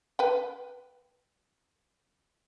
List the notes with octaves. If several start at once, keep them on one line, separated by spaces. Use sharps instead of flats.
B4 G5